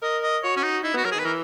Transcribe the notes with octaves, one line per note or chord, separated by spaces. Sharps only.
A#4 D#5
D#5
F#4 C#5
C#4
D#4
D#4 E4
B3 F#4
F#3 A#4
D#3 G#4
B4
E3 A#4